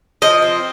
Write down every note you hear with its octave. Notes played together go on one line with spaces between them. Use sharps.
F3 D#5
C4